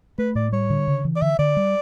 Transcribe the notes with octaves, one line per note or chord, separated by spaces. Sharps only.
A3 B4
A2 D5
G3 C#5
D3
C#3
E3
D5
D3 E5
D3 D5
G3